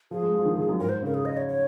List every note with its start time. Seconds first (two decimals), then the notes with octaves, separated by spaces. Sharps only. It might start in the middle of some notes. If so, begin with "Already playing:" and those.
0.11 F3 G#4
0.22 G#3
0.34 F3
0.45 D#3
0.57 D#3
0.69 F#2
0.80 G#2 A#4
0.89 C5
1.03 C#3 A#4
1.14 G#4
1.25 D#5
1.37 C#5
1.48 C#5